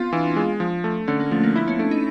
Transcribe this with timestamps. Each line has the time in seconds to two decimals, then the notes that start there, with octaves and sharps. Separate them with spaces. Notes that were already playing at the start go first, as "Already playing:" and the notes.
Already playing: B3 C4 F4
0.13 E3 D4
0.36 G#3
0.60 F3
0.84 A3
1.08 D3 C#4
1.20 A#3
1.31 F3 A3
1.43 A#3
1.56 B3 E4
1.68 C#4
1.79 A3 D4
1.91 D#4